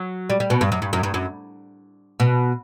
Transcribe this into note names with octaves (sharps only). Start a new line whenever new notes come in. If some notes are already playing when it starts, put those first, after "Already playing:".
Already playing: F#3
G3
G3
B2
G2
F#2
G2
F#2
G2
F#2
B2